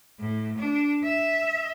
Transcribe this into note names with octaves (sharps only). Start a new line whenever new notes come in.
A2
D4
E5